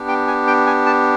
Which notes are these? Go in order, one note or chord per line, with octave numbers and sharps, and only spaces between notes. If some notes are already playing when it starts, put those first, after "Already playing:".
Already playing: B3 D4 G4
G5
G#5
G5
G#5
A5